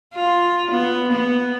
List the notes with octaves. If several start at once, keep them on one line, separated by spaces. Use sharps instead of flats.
F4
B3
B3